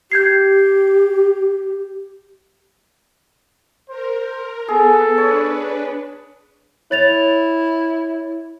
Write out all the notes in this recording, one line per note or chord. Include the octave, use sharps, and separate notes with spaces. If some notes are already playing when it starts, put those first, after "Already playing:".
G4 G6 G#6 C7
A#4 C5
B3 G#4 A4
D4 B4 C#5
E4 C#5 A6 F7